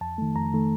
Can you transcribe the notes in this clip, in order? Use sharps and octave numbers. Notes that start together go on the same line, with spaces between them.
F2 A5
D#3 A3
F2 A#5
D#3 A3